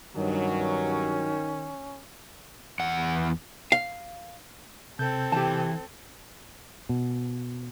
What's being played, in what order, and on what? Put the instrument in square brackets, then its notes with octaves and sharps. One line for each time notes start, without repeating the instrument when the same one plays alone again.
[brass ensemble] G2 F#3 [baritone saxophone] D#3 [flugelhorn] C#4
[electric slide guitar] E2 F#5
[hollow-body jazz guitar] F5
[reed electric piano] C3 G6 [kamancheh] C4 A4
[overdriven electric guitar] E3 [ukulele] G4 A5
[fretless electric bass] B2